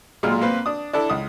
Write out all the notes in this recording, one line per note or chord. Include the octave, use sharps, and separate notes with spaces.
B1 A#2 G#3 F4 F6
A#3 C4 B4
D4 D#6
D4 E4 A4
C#2 D#6